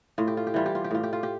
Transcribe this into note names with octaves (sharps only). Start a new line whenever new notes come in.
A2 F4
G4
F4
G4
E3 G3 F4
G4
F4
G4
A2 F4
G4
F4
G4